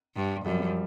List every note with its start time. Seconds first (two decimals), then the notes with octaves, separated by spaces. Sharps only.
0.16 G2
0.45 F#2 F3 G3
0.59 F3 G3